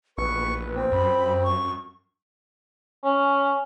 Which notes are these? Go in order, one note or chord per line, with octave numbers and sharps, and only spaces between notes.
A#1 B4 C#6
C4
F#2 B5
C#6
C#4